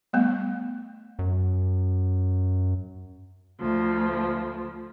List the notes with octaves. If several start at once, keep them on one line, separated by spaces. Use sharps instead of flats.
G3 A3 B3
F#2
D2 F3